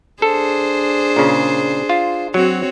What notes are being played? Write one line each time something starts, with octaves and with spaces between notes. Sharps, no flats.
D4 G#4 A4 C5
A#2 C#3
F4
F#3 C4 F#4 C#5